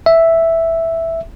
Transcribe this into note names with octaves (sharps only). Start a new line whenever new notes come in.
E5